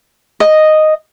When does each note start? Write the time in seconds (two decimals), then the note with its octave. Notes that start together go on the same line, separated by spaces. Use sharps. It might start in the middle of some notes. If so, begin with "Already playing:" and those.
0.40 D#5